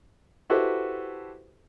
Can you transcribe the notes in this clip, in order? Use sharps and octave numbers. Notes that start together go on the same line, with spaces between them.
E4 F#4 G4 A4 B4 C5